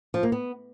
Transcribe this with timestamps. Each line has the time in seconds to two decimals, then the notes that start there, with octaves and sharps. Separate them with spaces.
0.14 F3
0.23 A#3
0.32 B3